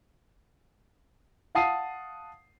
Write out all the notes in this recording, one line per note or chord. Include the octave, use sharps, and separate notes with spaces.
F5 F#5 A5 D#6 C7 D#7